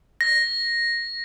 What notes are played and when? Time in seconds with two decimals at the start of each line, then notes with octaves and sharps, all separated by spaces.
0.21 A#6